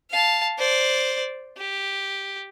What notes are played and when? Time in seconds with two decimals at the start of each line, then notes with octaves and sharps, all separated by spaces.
0.11 F5 A5
0.58 C5 D5
1.58 G4